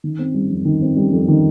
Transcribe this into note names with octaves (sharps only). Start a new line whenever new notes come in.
D#3
C4
G3
F2
D#3
C4
G3
F2
D#3